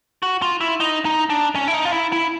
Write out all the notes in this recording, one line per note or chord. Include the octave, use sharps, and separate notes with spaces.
F#4
F4
E4
D#4
D#4
D4
C#4
E4
D#4
F4
E4
E4